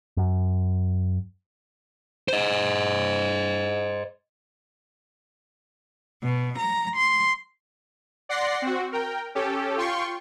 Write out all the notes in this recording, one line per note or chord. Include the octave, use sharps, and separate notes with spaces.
F#2
C5 D#5
B2
A#5
C6
D5 F#5 C6 A#6 C7
C4 F#4
A#4 G5
C#4 G4 A4
F4 G5 C6 C#6